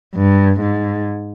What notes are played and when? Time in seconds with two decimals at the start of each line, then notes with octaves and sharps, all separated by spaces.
0.15 G2
0.61 G#2